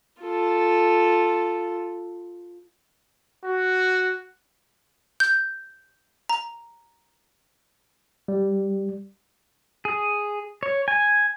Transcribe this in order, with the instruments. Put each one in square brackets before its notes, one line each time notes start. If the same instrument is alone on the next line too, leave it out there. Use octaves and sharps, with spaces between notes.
[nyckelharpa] F4 A4
[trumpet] F#4
[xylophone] G6
A#5
[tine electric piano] G3
[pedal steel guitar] G#4
C#5
G#5